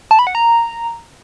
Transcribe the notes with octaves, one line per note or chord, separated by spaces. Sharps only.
A5
B5
F#5
A#5